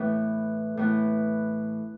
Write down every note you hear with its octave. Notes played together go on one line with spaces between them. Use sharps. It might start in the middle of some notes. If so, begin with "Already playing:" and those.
Already playing: A2 E3 B3
A2 E3 B3